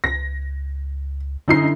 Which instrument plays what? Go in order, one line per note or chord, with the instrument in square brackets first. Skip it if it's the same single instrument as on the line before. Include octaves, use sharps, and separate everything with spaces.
[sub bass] C#2 [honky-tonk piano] A#6
[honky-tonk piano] F#2 D#4 C7 [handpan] D3 E4